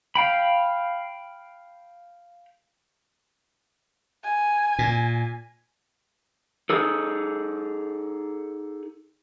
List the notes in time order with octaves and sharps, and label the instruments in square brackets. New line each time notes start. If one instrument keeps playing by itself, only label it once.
[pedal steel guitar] F5 G5 B5
[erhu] G#5
[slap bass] A#2
[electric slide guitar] D#4 G#4 A4